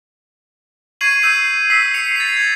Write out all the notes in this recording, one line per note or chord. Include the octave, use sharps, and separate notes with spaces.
C#6 G#6 C7 D#7 F#7
E6 G6 G#6 C7 D#7
E6 B6 C7
C7 C#7 F7
A6 C7
G#6 A6